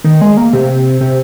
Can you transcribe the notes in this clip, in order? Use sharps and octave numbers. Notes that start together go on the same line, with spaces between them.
D#3
G#3
A#3
C3
C3